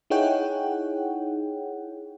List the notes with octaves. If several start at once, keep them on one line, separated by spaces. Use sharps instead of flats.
D#4 E4 G#4 C#5 F#5 G5